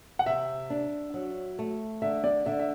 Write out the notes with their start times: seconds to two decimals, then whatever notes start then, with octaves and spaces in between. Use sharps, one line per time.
0.19 F#5
0.26 C3 E5
0.70 D4
1.14 F#3
1.59 A3
2.02 D3 E5
2.24 D5
2.46 D3 E5
2.59 E5